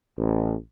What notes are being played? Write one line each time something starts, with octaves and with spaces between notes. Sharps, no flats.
A1